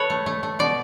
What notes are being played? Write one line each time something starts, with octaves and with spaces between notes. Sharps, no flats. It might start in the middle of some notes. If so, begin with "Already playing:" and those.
Already playing: A4 B4 C#5
A3
A3
A3
B2 D5